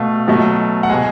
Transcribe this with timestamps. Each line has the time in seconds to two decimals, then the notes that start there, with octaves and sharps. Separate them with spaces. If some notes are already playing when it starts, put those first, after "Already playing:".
Already playing: B2 A3 F5
0.28 B2 F#3 A3
0.83 F#5
0.89 B2 G#3 G#5